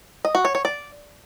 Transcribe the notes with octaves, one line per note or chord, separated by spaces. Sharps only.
D#5
F#4
C#5
C#5
D5